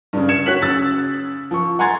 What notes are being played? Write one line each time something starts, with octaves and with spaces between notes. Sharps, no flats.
G2 C#3
G#6 C#7 E7
F#4 C#5 F#6 B6 F#7
C#3 E6 A6
F3 C#6
F#5 G#5 A#5 C6 G#6 A6